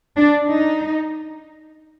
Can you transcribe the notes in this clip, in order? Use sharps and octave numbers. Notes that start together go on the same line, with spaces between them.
D4
D#4